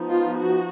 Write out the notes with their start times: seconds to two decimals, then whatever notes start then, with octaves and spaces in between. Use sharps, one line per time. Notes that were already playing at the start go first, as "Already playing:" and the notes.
Already playing: F3 B3 D#4
0.10 F4
0.39 F#4